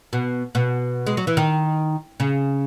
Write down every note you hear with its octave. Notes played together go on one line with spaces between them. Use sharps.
B2
B2
G#3
F#3
E3
D#3
C#3